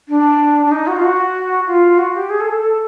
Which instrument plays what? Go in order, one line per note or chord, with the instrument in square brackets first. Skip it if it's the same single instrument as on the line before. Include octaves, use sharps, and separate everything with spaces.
[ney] D4
D4
D#4
F#4
F4
F#4
F4
F#4
G4
G#4
A4
A4
A4